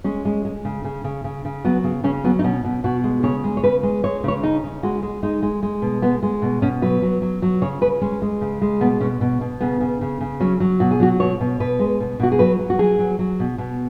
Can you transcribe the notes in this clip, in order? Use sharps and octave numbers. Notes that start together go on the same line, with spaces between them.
G#3 C#4
G#3
G#3
C#3
C#3
C#3
C#3
C#3
F#3 B3
C#3
C#3 C#4
F#3 B3
D#4
B2 C#4
B2
B2 F#4
G#3
C#3 C#5
G#3
C#5
C#3 B4
G#3
G#3 C#5
C#3 C#5
C#3 D#4
C#3
G#3 F#4
G#3
G#3 D#4
G#3
G#3
B2
G#3 B3
G#3
B2
B2 C#4
F#3 B4
F#3
F#3
F#3
C#3 C#5
C#3 B4
G#3 C#4
G#3
C#3
G#3
B2 B3
B2 C#4
B2
B2
C#3 B3
C#3
C#3
C#3
F#3 C#4
F#3
B2 F#4
G#4
F#3 F#4
B2 C#5
B2
B2 B4
G#3
B2
B2 F#4
G#4
F#3 B4
F#3
F#4
F#3 G#4
F#3
F#3
B2
B2